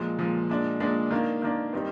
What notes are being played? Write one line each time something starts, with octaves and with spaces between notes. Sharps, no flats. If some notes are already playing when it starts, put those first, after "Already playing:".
Already playing: A#2 F3 G#3
A#2 F3 G#3
A#2 G#3 D4
A#2 G#3 D4
D#3 A#3 D4
D#3 A#3 D4
D#3 G3 C4 D#4